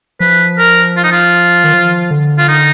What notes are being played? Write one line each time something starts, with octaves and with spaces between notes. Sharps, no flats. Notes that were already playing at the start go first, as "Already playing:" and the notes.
F3 B4
A#4
F4
D#4
F4
D#3
F3
D3
F4
D#4